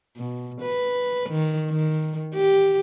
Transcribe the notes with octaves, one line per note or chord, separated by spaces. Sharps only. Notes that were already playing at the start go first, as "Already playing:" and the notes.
B2
B4
D#3
D#3
G4